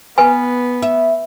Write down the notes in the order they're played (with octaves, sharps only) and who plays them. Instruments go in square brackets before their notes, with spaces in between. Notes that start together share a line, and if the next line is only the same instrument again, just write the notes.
[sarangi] B3 [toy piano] B4 G#5
[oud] E5